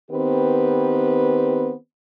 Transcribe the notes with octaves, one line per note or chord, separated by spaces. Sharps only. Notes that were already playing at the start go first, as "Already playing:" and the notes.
D#3 B3 C4 G4 B4